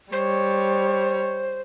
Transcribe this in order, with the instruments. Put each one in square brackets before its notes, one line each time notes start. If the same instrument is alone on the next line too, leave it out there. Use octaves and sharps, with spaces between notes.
[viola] G3 C#5 [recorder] C5